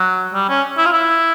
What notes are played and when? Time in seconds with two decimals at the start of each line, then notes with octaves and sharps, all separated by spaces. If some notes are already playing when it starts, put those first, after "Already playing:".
Already playing: F#3
0.34 G3
0.49 C#4
0.78 E4
0.86 F4
0.93 E4